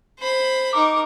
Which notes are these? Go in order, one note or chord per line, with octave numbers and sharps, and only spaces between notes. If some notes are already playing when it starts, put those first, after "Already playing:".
C5 B5
D#4 A#4 D6